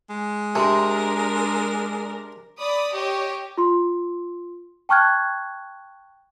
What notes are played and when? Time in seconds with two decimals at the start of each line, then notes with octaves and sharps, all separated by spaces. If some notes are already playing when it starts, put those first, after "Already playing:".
0.10 G#3
0.55 C3 D4 A#4 A5 C6
2.59 D5 B5 D#6
2.94 G4 C#5 D#5
3.57 F4 C6
4.89 G5 A5 C#6 F6 F#6 G#6